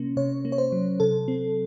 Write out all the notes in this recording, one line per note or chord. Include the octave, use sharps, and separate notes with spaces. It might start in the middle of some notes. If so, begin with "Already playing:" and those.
Already playing: C3 A#3 C#4
C3 C#5
A#3
C#5
C5
F#3
C3 A4
C4